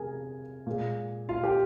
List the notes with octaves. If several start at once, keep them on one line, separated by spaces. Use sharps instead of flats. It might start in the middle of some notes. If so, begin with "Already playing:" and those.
Already playing: C3 F3 G#4 A#4 G#5
A#2 G#3
F4 F5
G4 G5